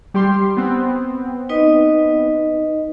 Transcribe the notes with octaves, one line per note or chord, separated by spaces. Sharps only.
G3 G4 C6
B3 C4
D#4 B4 D#5